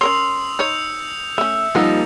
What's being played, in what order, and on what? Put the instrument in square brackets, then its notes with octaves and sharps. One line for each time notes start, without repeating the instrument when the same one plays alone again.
[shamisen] C#4 A#4 C#5 [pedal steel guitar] C6 [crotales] D#6 E6 F7
[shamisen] D#4 C#5 [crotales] G6 C#7 F7
[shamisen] A3 C#4 [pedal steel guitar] E5
[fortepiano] F3 G3 D#4 [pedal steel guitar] A#3 E6 [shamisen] A#4 F#5 A5